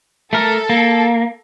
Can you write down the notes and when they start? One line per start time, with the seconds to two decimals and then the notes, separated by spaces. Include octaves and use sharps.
0.33 A3 A4 A#4
0.70 A#3